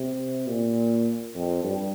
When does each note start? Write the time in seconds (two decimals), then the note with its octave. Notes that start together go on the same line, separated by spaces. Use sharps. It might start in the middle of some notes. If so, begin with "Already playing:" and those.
Already playing: C3
0.47 A#2
1.35 F2
1.64 G2